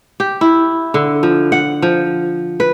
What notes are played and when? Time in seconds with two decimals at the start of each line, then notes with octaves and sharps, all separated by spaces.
0.20 G4
0.41 E4
0.94 D3
1.23 F3
1.52 F#5
1.82 F3
2.60 B4